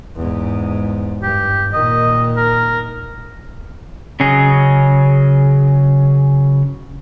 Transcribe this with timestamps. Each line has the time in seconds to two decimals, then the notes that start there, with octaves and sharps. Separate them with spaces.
0.16 E2 G#2
1.22 G2 G4
1.73 A#2 D#3 D#5
2.37 A#4
4.20 C#3 F#3 C#4 G#4 D#5